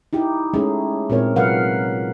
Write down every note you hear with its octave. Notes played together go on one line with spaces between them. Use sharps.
D#4 E4 G4
G#3 A3 C#4 D#4 G#4
A#2 G#3 C4 A#4 C#5
C3 F#3 A#4 B4 F5 F#5